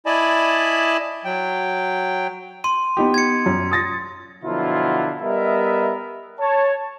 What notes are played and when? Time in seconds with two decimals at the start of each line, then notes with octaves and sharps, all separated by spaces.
0.06 E4 D5 D#5 G#5 A5 B5
1.25 F#3 G5
2.64 C6 D#7
2.97 B3 D#4 G4
3.14 G#6 C#7
3.46 F#2
3.71 D#6 A6 A#6
4.45 B2 D3 F3 F#3 E4 F4
5.22 G3 B3 A#4 D#5 E5
6.40 C#5 A5